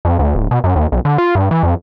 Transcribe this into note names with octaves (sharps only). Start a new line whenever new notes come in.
F2
D2
D1
B2
F#2
D#2
B1
D3
F4
G2
E3
F2